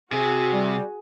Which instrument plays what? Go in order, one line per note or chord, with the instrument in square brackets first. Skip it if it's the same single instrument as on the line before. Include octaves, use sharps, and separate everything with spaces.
[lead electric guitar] C3 [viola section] F#4 [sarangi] G#4
[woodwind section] G3